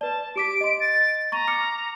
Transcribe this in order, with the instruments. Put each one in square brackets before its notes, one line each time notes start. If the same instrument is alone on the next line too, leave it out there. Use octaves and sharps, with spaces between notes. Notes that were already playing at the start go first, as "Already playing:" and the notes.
[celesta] B4 D5 [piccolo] A5
[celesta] G4 D6 B6 [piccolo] D7
[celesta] D#5 C6
[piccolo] A6
[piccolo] A#5 [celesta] C#6 A6 D#7
[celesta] D6 F6 C#7